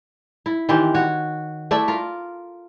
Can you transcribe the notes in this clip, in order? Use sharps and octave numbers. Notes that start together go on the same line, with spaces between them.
E4
D#3 E3 C4 G4
F#4 C#5
A3 E4 D5 E5
F4 A#4